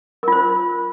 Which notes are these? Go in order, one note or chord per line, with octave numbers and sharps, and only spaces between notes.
F4 A#4 C5